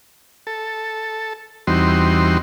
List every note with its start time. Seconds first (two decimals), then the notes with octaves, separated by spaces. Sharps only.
0.47 A4
1.67 E2 G3 C4 D#4 F#4 C6